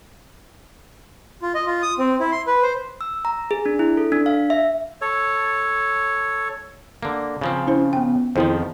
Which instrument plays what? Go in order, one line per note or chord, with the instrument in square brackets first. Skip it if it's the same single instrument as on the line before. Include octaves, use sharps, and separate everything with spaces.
[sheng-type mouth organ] F4
D#5
F4
D#6
C4
E4
C6
B4
C5
[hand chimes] E6
A#5
G#4
D4
E4
A4
D4
F5
E5
[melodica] A4 C#5
[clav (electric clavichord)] D3 A#3
C#3 F3 C4
[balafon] C#4 E4 C5
B3 G5
[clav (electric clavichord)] F2 D#3 F3 [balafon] E4 G#4 C5